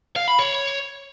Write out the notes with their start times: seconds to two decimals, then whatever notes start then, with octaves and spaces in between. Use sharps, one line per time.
0.16 F5
0.28 B5
0.39 C#5